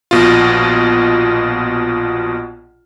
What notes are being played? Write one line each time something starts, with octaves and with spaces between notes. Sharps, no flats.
A#1 B2 F4